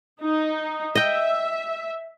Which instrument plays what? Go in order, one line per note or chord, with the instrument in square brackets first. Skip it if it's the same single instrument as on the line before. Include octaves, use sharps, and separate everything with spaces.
[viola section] D#4
[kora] D#5 G5 [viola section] E5